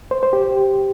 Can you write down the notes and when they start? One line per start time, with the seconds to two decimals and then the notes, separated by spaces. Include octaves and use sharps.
0.11 C5
0.23 C5
0.33 G4